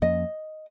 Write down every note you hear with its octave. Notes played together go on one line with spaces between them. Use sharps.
F2 F3 A#3 C#4 D#5